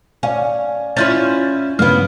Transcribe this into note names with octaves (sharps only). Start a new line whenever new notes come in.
C#4 D5 F5 G#5
C#4 E4 F4 F6 G6 A6
G2 C#3 A#3 B3 F5 F6